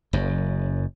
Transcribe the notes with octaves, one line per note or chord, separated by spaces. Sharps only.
F#1 F#2